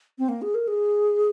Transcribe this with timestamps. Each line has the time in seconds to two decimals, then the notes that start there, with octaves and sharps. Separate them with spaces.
0.18 C4
0.29 A#3
0.42 G#4
0.54 A#4
0.67 G#4